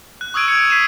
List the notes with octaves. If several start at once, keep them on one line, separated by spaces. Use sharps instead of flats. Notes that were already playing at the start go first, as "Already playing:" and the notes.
F#6
C#6 D#6 E6 G#6 D7 D#7
G#6 C#7
G#6 B6 C7 D#7 E7